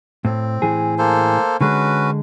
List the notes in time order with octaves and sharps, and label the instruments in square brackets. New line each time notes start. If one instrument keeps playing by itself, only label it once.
[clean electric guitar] A2 [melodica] C4
[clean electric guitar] A2 E3 G#4
[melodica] A#3 A4 C5
[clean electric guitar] D3 G#3 [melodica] C#4 F#4 B4